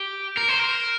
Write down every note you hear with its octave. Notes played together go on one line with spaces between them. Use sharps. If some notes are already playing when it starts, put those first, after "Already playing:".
Already playing: G4
A#4
C5
A#4